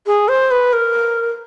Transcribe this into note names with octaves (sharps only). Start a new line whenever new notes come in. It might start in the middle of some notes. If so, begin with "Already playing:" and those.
G#4
C5
B4
A#4